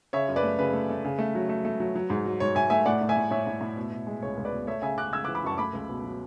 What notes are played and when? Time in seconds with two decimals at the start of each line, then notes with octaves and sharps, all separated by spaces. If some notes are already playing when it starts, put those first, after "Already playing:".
0.13 C#3 C#5 E5
0.28 F#2
0.36 B4 D5
0.43 A3
0.59 C#3 B4
0.73 A3
0.90 A3
1.05 C#3
1.19 A3
1.35 F#3
1.49 A3
1.65 A3
1.80 F#3
1.96 F#3
2.10 G#2
2.26 F#3
2.40 G#2 C#5
2.55 G#2 E5 G#5
2.70 A3 E5 G#5
2.86 A2 D5 F#5
3.01 A2
3.09 E5 G#5
3.16 A2
3.31 A2 C#5 E5
3.47 A2
3.61 A2
3.76 B2
3.92 B2
4.07 G#3
4.22 C#2 C#5
4.37 C#2
4.45 B4 D5
4.52 B2
4.67 A3 C#5 E5
4.82 C#3 E5 G#5
4.97 C#3 D6 F#6
5.13 C#3 E6 G#6
5.24 D6 F#6
5.28 E3
5.35 B5 D6
5.44 F#2 A5 C#6
5.58 A3 B5 D6
5.73 C#2
5.89 B2
6.04 F#3